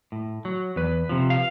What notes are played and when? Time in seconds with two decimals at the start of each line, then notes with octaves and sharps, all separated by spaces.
0.12 A2
0.45 F#3
0.76 E2 B4
1.09 C3 F3
1.30 F5